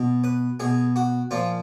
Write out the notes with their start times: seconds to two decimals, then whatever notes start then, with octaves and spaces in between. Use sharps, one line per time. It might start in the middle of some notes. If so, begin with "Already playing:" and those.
Already playing: B2
0.24 B4
0.60 B2 G#4
0.96 F#4
1.31 A#2 F3 F4